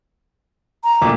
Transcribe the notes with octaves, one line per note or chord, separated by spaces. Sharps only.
A#5
D2 A#2 D6